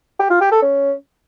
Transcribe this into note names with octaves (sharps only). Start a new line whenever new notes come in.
G4
F4
G4
A4
C#4